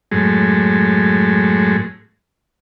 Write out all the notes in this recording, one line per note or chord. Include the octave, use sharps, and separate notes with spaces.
F#2 A2 G#3